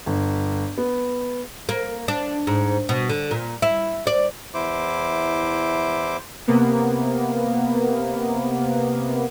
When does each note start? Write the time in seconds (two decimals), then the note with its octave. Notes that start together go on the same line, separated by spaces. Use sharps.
0.06 G1
0.78 B3
1.69 A#3
2.08 D4
2.47 G#2
2.89 B2
3.09 D3
3.31 A#2
3.62 E4
4.07 D5
4.54 E2 E4 C5 D6
6.48 C3 A#3 B3